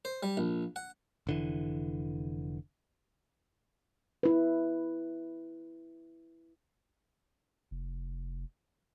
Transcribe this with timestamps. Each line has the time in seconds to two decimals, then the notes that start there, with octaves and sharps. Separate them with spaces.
0.05 C5
0.23 G3
0.37 A#1
0.76 F#5
1.27 F1 D3 E3
4.23 E4 B4
7.71 F1